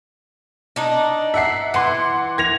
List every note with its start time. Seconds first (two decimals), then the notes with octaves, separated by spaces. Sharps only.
0.76 D4 D#4
1.34 E5 F#5 C7
1.74 E3 F#5 C6 D6
2.38 G#6 A#6 F7